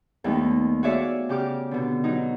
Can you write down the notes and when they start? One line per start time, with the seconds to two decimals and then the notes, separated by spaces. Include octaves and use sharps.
0.24 D#2 G3 A3 B3 D#4
0.83 F#4 G#4 C#5 D5 E5 F5
1.29 C#3 G4 D6 F6
1.71 B2 D3
2.04 F#3 D#4